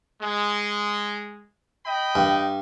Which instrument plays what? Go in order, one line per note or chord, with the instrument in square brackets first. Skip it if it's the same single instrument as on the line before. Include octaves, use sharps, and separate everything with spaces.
[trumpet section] G#3
D#5 G5 B5
[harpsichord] G2